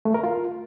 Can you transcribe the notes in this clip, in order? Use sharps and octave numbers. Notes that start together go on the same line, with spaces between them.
A3
A#4
F4